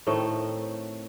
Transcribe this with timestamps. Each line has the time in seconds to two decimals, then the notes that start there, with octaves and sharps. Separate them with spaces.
0.07 A2 D#3 A3 C4